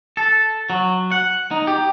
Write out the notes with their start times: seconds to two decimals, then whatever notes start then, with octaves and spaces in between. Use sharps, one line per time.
0.17 A4
0.70 F#3
1.11 F#5
1.51 D#4
1.67 G4